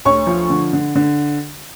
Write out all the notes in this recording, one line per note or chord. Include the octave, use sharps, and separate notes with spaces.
D2 C#5 C#6
F3
D3
D3
D3